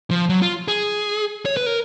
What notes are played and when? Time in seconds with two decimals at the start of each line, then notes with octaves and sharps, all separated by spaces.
0.11 F3
0.29 F#3
0.42 F4
0.68 G#4
1.45 C#5
1.57 B4
1.66 A#4